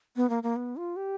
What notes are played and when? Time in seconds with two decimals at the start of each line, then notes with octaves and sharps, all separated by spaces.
0.16 B3
0.30 A#3
0.43 A#3
0.56 B3
0.77 F4
0.96 G4